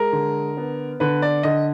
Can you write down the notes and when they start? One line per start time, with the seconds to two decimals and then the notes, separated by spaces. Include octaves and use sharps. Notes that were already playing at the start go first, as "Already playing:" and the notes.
Already playing: G#3 A#4
0.13 D3
0.57 B3
1.00 D3 B4
1.22 D5
1.43 D3 D#5